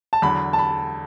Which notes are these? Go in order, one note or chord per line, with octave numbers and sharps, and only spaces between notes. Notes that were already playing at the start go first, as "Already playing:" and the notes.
A5
E2 D3 F#3 B5
A5
B5